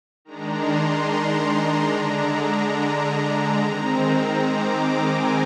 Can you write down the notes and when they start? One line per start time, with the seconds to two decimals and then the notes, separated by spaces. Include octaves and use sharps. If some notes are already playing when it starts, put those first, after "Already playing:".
0.25 D#3 G#3 D4 A#5
0.52 C6
0.81 C6
1.10 A#5
1.93 D3 G#3 D4
2.78 A#5
3.62 D#3 G#3 C4
4.46 D6
5.02 G#5